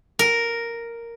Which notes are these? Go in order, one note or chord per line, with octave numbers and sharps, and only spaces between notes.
A#4